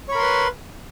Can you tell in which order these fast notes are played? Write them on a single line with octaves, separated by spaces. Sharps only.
C#5 B5 A#4 C6 B4